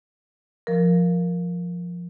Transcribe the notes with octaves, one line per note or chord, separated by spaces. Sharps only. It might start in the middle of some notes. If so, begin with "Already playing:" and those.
F3 A#4